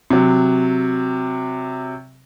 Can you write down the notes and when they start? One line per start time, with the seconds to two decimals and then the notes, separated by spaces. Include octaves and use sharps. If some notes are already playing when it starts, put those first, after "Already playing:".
0.10 C3 F#3